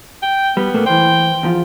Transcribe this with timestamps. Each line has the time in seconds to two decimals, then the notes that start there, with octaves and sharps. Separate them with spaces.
0.23 G5
0.57 G3 B3
0.74 A#2 A3 A#3
0.86 E3 C5 G5
1.43 E2 F3 F4